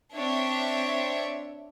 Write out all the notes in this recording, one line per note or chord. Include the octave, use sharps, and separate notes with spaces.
C4 D4 C#5 E5